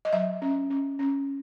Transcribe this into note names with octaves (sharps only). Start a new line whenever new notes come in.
D#5
F#3 E5
C#4
C#4
C#4